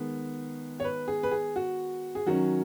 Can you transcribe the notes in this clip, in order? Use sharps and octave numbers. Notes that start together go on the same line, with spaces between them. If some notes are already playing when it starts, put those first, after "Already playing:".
Already playing: D#3 G#3 B3
C#5
B4
G#4
B4
G#4
F#4
G#4
D#3 F#3 C#4 F#4